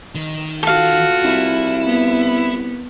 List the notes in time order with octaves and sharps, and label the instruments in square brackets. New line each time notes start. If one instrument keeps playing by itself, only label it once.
[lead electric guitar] D#3
[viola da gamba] F4 F#4 [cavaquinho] A4 F5
[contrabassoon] C2 [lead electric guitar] E4
[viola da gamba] B3